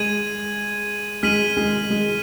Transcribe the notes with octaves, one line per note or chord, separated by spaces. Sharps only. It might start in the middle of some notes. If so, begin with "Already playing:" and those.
Already playing: G#3 G#6 D#7 F#7
G#3 F6 B6 D#7 F#7
G#3
G#3